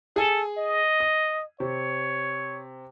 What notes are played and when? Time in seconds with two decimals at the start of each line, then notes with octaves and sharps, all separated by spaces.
0.16 G#4 A4 G#5
0.58 D#5
1.00 D#6
1.60 C3 C#5